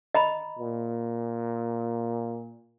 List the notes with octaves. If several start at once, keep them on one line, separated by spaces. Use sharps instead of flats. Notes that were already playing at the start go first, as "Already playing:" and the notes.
D#5 A#5 B5
A#2